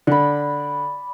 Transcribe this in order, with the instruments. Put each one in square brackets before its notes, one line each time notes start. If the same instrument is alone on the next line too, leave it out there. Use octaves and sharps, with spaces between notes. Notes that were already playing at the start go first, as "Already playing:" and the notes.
[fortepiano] D3 [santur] D5 B5